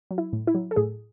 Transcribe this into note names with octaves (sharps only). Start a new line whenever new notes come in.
F#3
E4
A2
E4
F#3
A4
A2 G#4